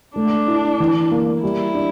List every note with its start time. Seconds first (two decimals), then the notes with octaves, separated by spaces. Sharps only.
0.16 A3 D4
0.48 E4
0.80 E3
1.11 A#3
1.43 G3 E4
1.75 D4